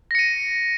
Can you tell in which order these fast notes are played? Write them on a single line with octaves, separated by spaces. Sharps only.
A#6 C#7 D#7